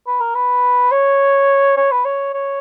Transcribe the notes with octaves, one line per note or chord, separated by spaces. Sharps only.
B4
A#4
B4
C#5
C#5
B4
C#5
C#5